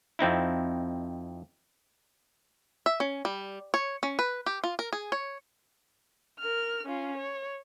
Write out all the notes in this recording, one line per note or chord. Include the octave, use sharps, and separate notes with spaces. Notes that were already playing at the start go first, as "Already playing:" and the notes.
F2 C4 D#4 E4
E5
C#4
G3
C#5
C#4
B4
G4
F4
A#4
G#4
C#5
A#4 F6
C#4 F4
C#5